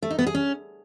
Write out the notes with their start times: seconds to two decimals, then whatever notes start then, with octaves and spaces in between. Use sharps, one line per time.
0.02 A3
0.11 D#4
0.19 B3
0.27 G#4
0.35 C#4